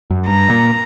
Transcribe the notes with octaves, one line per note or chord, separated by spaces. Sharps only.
F#2
G2 A#5
A#2